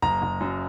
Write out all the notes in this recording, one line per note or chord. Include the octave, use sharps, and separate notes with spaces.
F#1 A#5
F#1
F#2